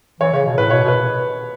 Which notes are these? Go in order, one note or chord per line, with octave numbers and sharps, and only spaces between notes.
E3 C#5
C#3 C#5
B2
A2 B4
B2 C#5
B2
B4